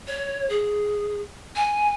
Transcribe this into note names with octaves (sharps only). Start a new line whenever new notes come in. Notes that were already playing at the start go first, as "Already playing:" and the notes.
C#5
G#4
G#5